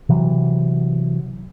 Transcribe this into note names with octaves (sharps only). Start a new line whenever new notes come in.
C3 E3 F#3